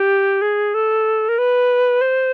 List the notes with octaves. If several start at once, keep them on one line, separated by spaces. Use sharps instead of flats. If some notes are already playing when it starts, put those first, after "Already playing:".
Already playing: G4
G#4
A4
A#4
B4
C5